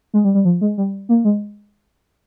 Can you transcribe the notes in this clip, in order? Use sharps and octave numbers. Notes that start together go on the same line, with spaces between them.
G#3
G3
G3
F3
G#3
G3
A#3
G#3